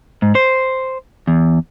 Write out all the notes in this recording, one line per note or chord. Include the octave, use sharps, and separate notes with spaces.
G#2
C5
E2